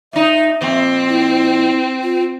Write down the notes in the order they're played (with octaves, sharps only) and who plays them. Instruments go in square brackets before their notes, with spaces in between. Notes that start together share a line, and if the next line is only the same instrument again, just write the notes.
[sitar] A#2 D#4 [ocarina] E5
[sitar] F2 A#2 [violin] C4
[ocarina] E4
F4